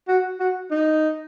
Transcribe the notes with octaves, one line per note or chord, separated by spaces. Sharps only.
F#4
F#4
D#4